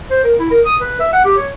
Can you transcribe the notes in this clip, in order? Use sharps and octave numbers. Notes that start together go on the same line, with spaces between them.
C5
A#4
E4
A#4
D#6
B4
E5
F#5
G4
C#5